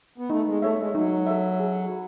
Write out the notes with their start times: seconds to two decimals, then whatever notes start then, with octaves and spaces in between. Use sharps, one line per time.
0.18 B3
0.30 A3 D#4
0.47 G#3
0.62 A3 A4 C#5 E5
0.79 G#3
0.95 F#3 D#4
1.26 A4 C#5 E5
1.60 G#4
1.92 B5